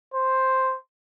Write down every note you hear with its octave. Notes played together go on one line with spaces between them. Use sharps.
C5